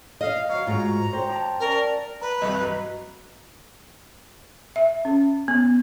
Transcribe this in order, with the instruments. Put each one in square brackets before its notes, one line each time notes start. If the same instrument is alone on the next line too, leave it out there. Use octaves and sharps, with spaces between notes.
[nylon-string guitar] D#5 [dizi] F5
[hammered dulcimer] F#3 C#5 [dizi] F5
[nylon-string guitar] G#2 F4 [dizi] A#5
[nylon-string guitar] C5 [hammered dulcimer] G5
[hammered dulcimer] A5 D6
[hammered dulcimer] C#4 D5 A5 [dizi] A#4
[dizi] B4 [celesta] A#5
[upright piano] C2 G2 [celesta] D#5
[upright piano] F#3
[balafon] E5
C#4
B3